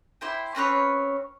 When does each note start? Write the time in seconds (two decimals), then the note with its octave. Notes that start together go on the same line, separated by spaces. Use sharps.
0.21 E4 C5 G5
0.55 C4 C#4 B4 C#5